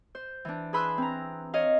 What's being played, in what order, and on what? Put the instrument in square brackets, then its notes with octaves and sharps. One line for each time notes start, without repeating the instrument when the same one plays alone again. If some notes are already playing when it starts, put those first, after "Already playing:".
[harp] C5
E3 D4
G#4 B4 B5 C6 E6 F#6
C4 A#5
C#5 D#5 F5